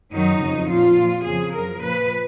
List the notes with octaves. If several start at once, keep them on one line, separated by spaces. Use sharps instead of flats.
F#2 D#3 F#3 D#4
F2 C#3 F#3
A#2 F3 F4
A#2 F3
F2 C#3 F3 G#4
F#2 F3 A#4
A#2 F3 B4